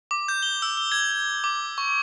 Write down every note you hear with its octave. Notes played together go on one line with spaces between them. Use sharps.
D6
G6
G7
E6
G7
G#6
D6
C#6